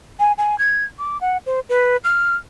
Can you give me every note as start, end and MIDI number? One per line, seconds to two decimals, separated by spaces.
0.19 0.32 80
0.38 0.58 80
0.58 0.84 92
0.99 1.18 86
1.21 1.37 78
1.46 1.60 72
1.69 1.97 71
2.04 2.35 89